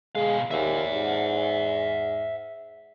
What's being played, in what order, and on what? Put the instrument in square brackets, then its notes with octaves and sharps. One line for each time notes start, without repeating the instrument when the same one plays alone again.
[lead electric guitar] B2 F5 [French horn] G#3
[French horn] D#2 [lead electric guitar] E5 F#5
[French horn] G#2